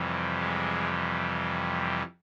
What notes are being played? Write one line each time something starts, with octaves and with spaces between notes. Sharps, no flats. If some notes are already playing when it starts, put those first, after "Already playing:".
Already playing: F2 C3 E3 G3
G#3